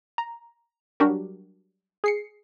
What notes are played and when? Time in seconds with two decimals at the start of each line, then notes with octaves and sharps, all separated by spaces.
0.18 A#5
1.00 F#3 G3 D4 F#4 G4 A#4
2.04 G#4 C7 C#7